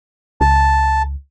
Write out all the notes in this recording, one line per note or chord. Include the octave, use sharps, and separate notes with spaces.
C#2 A5